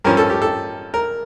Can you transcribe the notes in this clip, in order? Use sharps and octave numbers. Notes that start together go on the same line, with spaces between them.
G2 F3 C#4 A#4
A4
G4
A4
A#4